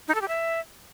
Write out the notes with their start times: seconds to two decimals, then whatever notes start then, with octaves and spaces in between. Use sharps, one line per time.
0.08 D#4
0.15 A4
0.21 G4
0.28 E5